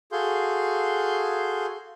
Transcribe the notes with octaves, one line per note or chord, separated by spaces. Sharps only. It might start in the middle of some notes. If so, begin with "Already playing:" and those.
F#4 G#4 A4 F5 C6 G6